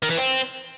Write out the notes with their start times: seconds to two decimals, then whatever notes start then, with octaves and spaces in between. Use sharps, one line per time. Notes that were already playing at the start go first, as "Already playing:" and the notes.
0.02 D#3
0.10 E3
0.17 C4